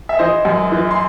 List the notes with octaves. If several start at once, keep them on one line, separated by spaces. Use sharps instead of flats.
E5
E3 C5 D#5
F#2
E3
C6